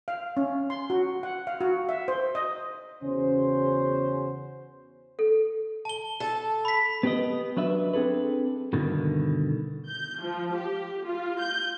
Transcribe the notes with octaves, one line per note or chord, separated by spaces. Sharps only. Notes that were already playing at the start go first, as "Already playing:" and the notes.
F5
C#4
C6
F#4
F#5
F5
F#4
E5
C5
D#5
E2 C#3 C#4 F#4 C5
A4
A5 G7
A4
B5 B6
B3 G4 B4 D#5
F#3 D4 B4 E5
C4 D4 G#4 A4 B4
G2 B2 D3 D#3
G6
F3
G4
F4
G6